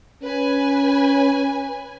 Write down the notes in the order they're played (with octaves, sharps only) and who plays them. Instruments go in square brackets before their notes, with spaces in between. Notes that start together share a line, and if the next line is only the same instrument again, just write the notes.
[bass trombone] C#4 [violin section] B4 G#5